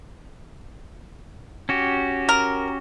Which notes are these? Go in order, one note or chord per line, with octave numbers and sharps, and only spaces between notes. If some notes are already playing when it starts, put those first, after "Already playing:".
C#4 F#4 G4
A#4